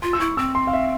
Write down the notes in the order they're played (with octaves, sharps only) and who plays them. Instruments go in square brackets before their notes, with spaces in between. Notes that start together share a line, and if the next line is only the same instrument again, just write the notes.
[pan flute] F4 [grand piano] C6
[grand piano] E6
[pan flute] E4 [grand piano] C#6
[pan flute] C4 [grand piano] E6
[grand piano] C6
F5
E5